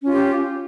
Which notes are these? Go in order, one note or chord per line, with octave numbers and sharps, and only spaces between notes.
C#4 F4 G4